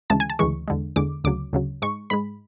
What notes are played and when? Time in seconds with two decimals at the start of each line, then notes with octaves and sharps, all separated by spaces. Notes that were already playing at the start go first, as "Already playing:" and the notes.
0.10 D2 C#3 E3 G#3 A5
0.20 G#5
0.30 A5
0.39 D2 C#3 E3 G#3 C#6
0.68 E2 D3 G#3
0.96 E2 D3 G#3 D6
1.24 D2 C#3 F#3 D6
1.53 D2 C#3 F#3
1.82 G#2 G#3 C#6
2.10 G#2 G#3 B5